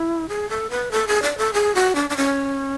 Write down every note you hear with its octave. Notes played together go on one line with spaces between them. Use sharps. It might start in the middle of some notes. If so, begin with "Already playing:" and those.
Already playing: E4
G#4
A4
B4
A4
G#4
D5
A4
G#4
F#4
D4
D4
C#4